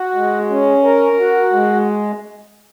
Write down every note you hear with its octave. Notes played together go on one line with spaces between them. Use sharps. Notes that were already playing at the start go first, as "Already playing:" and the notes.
Already playing: F#4
G#3
C#4
A#4
F#4
G#3